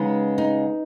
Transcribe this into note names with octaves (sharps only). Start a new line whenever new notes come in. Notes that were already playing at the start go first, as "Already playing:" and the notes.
Already playing: C#3 G#3 B3 D#4
D#4